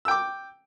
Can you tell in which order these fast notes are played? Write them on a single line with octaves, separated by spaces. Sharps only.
E6 G5 D6